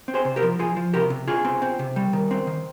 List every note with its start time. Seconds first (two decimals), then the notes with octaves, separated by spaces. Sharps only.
0.08 C4
0.14 G#4 C5
0.25 C3
0.36 G4 A#4
0.42 F3
0.59 F3 F4 G#4
0.77 F3
0.94 C3 G4 A#4
1.10 C3
1.27 C3 F4 G#4
1.45 C4
1.62 C4
1.79 C3
1.96 G3
2.13 D#3
2.31 C4
2.47 D#3